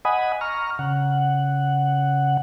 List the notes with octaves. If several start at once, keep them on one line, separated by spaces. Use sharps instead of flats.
D#5 F#5 G#5 B5 D#6
A#5 C#6 F6
C#3 F#5